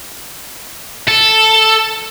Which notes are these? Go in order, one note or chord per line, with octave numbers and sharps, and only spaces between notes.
A4